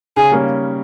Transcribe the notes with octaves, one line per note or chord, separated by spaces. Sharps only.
C#3 G#4
G3 A#3 C#4